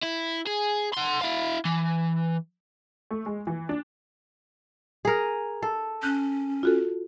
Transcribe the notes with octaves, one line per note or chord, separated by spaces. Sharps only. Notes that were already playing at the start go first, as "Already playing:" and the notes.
E4
G#4
F#5 C6
E4 F5
E3
A3
G#3
E3
D4
G#4 A#4
A4
C#4 F#6 G6
F4 F#4 A4